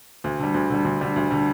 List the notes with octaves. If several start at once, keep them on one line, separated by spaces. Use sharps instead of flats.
D2
D3 G3
D2
D3 G3
D2
D3 G3
D2
D3 G3